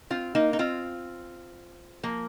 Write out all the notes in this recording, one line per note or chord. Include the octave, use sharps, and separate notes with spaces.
C4 F4
A#3 D#4
D#4
C4 F4
F3 A#3